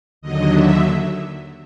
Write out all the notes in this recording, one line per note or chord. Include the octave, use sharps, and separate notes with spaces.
D#2 D3 F#3 D#5
E5